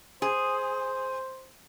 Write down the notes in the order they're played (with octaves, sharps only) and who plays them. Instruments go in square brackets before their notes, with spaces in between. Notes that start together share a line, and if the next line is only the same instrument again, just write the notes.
[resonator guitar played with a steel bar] G#4 [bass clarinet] C5